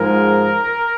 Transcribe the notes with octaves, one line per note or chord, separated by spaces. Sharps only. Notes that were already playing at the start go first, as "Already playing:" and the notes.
Already playing: G#2 F3 G#3 A#4